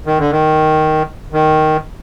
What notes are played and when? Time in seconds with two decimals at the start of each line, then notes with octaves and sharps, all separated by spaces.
0.06 D#3
0.19 D3
0.32 D#3
1.33 D#3